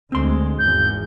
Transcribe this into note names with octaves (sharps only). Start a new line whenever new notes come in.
D2 G#3 C4 C6
G#1 E2 G6